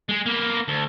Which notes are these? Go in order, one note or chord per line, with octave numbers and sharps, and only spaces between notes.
G#3 G#4
A#3 B3
D2